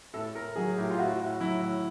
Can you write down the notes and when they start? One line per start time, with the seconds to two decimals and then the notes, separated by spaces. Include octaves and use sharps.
0.13 A2 A4
0.35 A2 A#4
0.56 F#3 G#4
0.77 A2 G4
0.91 F4
0.98 A2 F#4
1.20 A2
1.40 F#3 E4
1.61 A2